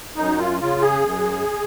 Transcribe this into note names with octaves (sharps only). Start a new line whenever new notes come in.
F#2 D#4
F4
C#3 F4
G#4
F#2